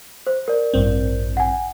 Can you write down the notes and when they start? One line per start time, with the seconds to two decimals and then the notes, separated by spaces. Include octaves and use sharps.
0.27 C5
0.48 A#4 D5
0.74 A1 G2 C4
1.37 F#5 G#5